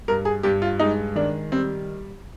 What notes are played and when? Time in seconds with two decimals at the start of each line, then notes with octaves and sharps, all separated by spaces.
0.08 G2 A#4
0.25 G#4
0.43 G2 G4
0.62 F4
0.79 G#3 D#4
1.16 D#3 D4
1.52 G3 C4